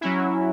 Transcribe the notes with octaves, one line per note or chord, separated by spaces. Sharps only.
F#3 C#4 E4